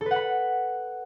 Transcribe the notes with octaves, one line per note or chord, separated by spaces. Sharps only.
A4
B4
F#5
B5